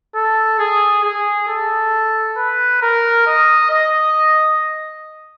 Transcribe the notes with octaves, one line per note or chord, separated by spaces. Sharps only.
A4
G#4
G#4
A4
B4
A#4
D#5
D#5